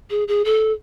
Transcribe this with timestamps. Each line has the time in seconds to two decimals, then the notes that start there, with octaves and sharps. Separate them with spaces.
0.10 G#4
0.28 G#4
0.45 A4